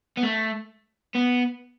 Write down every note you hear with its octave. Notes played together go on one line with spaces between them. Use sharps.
B3
A3
B3